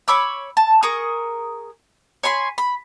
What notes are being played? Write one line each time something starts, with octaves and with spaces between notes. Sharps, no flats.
C#5 B5 D6 E6
A5
G#4 A#4 C#6 D#6
C#5 G#5 B5 C6
B5